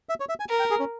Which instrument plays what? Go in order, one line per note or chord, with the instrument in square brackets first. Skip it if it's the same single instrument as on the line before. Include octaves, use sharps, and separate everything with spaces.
[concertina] E5
C#5
E5
G#5
[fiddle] A#4
[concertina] G5
G#4
C#4